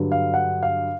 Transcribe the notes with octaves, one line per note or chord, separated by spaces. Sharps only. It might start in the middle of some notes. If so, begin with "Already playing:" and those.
Already playing: G2 D3 F#3
F5
F#5
F5